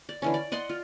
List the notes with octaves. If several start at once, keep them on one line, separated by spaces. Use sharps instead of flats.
D5
D3 E3 C#4
D5
D5 D#5 F#5 C6
F4